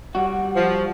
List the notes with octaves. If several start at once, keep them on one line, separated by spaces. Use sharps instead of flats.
G3 F#4 F#5
F3